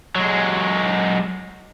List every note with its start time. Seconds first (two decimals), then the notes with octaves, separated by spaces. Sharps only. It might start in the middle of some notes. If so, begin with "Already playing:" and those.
0.16 F#3 G#3